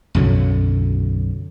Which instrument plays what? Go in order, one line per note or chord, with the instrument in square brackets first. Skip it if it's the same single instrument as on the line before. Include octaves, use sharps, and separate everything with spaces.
[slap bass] B1 F#2 D3 F#3